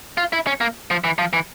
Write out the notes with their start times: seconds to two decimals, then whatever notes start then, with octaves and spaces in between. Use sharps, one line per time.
0.17 F4
0.33 E4
0.47 C#4
0.61 A#3
0.91 F3
1.04 E3
1.18 F3
1.33 E3